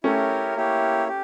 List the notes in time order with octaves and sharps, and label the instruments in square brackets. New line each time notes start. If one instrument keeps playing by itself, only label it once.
[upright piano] A3 C#4 [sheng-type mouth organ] E4 G4 A#4 C#5
[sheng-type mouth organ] A#3 E4 G4 C#5
G4